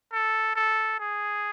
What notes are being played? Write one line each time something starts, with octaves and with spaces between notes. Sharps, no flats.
A4
A4
G#4